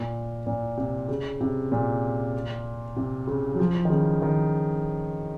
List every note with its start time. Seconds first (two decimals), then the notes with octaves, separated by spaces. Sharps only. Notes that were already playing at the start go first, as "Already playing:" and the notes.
Already playing: A#2
0.47 A#2
0.78 C3
1.09 C#3
1.41 C3
1.72 A#2
2.96 C3
3.27 C#3
3.55 F#3
3.59 F3
3.85 D#3
3.90 C#3
4.22 D#3